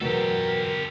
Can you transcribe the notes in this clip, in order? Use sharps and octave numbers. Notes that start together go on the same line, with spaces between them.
E2 B2 F#3 G4 A4 A#4